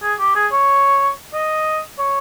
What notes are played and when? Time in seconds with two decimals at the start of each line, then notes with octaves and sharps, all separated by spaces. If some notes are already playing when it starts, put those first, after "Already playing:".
0.02 G#4
0.19 G4
0.36 G#4
0.52 C#5
1.34 D#5
1.99 C#5